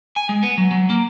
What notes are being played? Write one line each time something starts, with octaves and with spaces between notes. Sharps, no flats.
G#5
G#3
B3
F#3
F#3
A#3